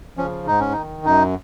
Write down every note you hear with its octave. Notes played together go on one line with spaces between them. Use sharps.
F3 C#4
C#3
G#2 D#4
C#4
D#3 D#4
F#2 D#4